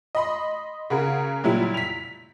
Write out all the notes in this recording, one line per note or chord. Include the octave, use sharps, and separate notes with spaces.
D#5 B5 C6
C#3 F#4 G#4 A#4
A#2 F#3 G3 E4
B6 F7